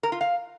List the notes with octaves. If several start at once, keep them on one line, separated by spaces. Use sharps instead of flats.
A#4
F4
F5